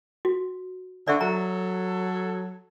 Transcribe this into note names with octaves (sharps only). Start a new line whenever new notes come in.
F#4
D3 D5 E5 C#6
F#3 A4 A#5